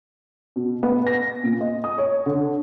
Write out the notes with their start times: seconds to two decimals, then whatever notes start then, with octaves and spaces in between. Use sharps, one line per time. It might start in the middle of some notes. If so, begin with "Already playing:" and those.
0.56 B2
0.83 B3
1.07 A#6
1.44 A#2
1.61 D#5
1.84 D#6
1.98 C#5
2.26 D3